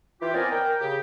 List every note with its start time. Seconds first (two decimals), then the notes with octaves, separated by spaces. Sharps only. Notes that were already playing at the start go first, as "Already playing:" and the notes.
0.21 E3 F4 G4
0.34 B3 C4 A#4 D5 D#5 G#5
0.51 A#4 G5
0.80 C#3 G4